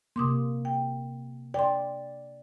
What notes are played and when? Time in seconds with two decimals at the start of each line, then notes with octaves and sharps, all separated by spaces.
0.16 C3 A#3 C6 D6 D#6
0.65 G5
1.54 D5 G5 C6